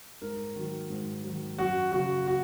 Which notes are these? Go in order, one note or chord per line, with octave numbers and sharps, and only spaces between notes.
G#2 A#4
D#3 F#3
G#2
D#3 F#3
F#2 F#4
C#3 F#3 F#4
F#4